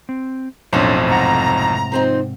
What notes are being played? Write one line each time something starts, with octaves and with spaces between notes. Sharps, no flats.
C4
B1 F2 A2 D4 C5 C#5
G#2 C3 F#5 A#5
F3 C4 D#4